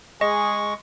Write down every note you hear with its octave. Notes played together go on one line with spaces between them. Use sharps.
G#3 G#4 D#5 C#6